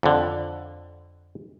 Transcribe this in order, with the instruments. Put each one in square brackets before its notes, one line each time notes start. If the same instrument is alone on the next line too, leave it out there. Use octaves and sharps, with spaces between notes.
[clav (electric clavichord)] F2 D3